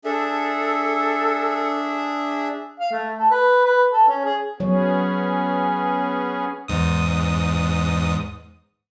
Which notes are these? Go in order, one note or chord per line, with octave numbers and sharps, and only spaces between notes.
D4 G#4 A4 E5
F5
A3
A4
B4
B4
A4
C#4
G#4
F#3 B3 C#4 G#4 C#5
E2 G#2 D#6